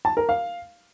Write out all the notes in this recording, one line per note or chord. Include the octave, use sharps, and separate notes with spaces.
A5
A#4
F5